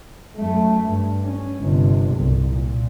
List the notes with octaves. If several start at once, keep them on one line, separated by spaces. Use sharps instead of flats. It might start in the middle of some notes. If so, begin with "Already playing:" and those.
F#2 A3
G2
C#4
G1 C3
C2
A#2